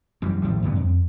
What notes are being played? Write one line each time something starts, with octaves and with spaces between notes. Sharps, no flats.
F#2 E3 G3
G#1 A2 F3 G3
D2 G2 A#2 B3
F2